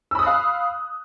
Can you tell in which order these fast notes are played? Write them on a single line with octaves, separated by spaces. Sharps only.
E6 B5 D#6 F#6 F5